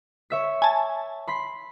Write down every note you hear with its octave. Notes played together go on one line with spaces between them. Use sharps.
C#5 E5 B6
G#5 A5
B5 C6 B6